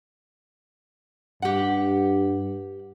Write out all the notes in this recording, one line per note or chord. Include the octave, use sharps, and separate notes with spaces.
G2 G4 F#5